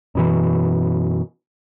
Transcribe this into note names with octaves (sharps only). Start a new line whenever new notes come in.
F#2 B2 E3